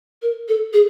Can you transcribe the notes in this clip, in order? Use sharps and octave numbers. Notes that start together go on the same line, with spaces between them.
A#4
A4
G#4